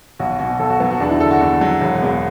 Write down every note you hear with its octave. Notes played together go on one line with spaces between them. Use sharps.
B1 F#4
B2 F#4
B1 A4
F#4
F#3 B3
F#4
E2 D4
E4
D3 A4
F#4
E2
F#3
E1
E2